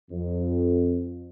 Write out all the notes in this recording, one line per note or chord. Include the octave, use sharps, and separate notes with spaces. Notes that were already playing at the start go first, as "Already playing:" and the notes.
F2